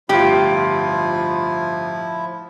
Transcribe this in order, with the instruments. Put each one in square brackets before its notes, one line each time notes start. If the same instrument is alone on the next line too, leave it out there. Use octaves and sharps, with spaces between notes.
[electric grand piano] G1 F4 [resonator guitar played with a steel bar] A2 G4 [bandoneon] F3 E4